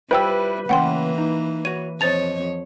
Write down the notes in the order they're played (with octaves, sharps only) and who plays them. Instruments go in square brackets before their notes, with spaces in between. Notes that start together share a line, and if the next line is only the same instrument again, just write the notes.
[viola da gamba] G3 [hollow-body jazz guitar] E4 F4 G4 [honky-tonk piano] B4 [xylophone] C5 G5 E6
[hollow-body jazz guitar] C#3 A3 C#4 [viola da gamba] E3 A#3 [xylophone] F#5 G5 C6
[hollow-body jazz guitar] D#4
[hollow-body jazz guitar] F#4 C#5 [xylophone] D#7
[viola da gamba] F2 C#5 [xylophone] C5 A6 F7 [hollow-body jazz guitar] D#5 A5